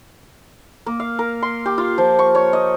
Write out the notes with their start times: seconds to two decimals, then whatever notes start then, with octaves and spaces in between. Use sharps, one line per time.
0.86 A#3
1.00 F5
1.19 A#4
1.42 C6
1.66 G4
1.78 F4
1.98 F3
2.19 C#6
2.35 C#5
2.53 D#5